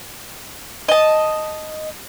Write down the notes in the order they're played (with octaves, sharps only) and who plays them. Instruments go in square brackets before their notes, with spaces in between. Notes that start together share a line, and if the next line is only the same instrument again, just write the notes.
[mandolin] D#5 A5